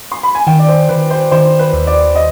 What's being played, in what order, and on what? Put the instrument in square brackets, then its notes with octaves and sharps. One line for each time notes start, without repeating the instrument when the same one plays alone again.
[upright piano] C6
B5
G#5
[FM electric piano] D#3 [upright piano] G5
[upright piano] D5
C5
[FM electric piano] D#3 [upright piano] B4
[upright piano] C5
[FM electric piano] D#3 [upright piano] C5
[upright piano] B4
[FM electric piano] D#2
[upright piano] D5
D#5